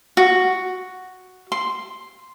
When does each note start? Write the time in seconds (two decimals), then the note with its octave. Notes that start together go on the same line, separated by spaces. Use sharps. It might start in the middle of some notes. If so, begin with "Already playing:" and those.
0.17 F#4
1.52 C6